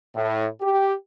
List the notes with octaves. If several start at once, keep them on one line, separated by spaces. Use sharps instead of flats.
A2
G4